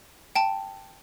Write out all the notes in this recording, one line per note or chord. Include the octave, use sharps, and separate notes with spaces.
G5 A5